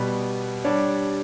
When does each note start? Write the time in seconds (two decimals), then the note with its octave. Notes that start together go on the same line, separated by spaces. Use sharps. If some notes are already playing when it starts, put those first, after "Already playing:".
Already playing: B2 G3 B3
0.64 G3 D4 G4 C#5